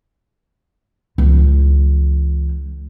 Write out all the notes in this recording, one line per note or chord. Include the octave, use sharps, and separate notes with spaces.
C#2 E3